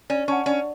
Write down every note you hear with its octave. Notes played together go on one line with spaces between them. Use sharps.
C#4 D5
C#4 F#5 A5 C#6
C#4 D5